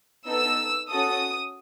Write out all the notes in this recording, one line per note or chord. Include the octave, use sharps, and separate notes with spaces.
B3 D#4 A4 E6
C#4 F#4 A4 D#6